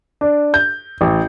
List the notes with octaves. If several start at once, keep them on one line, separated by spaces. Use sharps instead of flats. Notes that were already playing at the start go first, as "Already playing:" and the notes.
D4
G6
A1